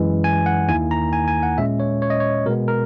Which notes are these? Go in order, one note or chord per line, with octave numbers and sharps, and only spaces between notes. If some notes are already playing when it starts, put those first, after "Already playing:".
Already playing: F#2 E3 G#3
G#5
F#5
D#2 D#3 A#3 E4 G#5
A#5
G#5
G#5
F#5
A#2 G#3 C#4 E5
C#5
C#5
D#5
C#5
B2 G#3 B3 A#4
A#4